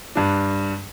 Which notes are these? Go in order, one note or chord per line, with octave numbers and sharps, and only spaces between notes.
G2 D4